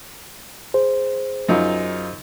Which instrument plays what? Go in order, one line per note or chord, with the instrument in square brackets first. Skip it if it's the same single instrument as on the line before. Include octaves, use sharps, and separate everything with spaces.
[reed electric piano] G#4 C5
[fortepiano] F#2 D#4 F4